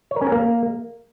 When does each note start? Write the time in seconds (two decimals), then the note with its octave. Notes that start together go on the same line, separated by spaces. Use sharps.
0.11 C#5
0.16 A#4
0.22 C#4
0.27 A#4
0.32 A#3